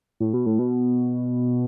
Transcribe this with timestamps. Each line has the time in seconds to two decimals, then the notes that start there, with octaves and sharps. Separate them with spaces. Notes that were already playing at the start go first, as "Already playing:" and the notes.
0.20 A2
0.34 B2
0.46 A2
0.59 B2